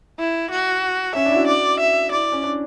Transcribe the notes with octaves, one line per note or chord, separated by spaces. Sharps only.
E4
F#4
C#4 E5
D4
E4
F#4
D5
E5
E4 D5
C#4
D4